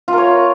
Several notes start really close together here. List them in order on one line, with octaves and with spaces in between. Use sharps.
F4 A#4 C#5